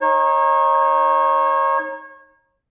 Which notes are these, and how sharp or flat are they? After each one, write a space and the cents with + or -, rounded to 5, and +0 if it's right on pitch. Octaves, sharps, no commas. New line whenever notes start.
D#4 +0 C#5 -35